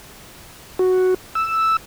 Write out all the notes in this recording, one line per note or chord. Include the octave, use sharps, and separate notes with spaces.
F#4
E6